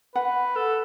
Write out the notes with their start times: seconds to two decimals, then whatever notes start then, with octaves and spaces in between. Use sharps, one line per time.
0.15 B4 F#5
0.56 A4